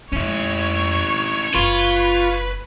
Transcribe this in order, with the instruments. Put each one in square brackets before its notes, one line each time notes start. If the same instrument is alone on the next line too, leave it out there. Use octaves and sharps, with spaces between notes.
[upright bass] F2 G#3 [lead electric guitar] C#4 E4 [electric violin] C#5 C#6
[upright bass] F#1 [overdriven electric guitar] F4 [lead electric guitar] B4